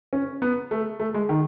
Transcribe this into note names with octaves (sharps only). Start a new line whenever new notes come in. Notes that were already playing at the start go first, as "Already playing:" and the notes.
C#4
B3
A3
A3
G#3
D#3